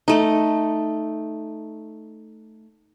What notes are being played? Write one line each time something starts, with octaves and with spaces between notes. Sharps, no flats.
A3 D#4